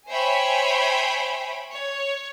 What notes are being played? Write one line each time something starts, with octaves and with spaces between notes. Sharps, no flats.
C5 C#5 E5 G5 G#5 B5
C#5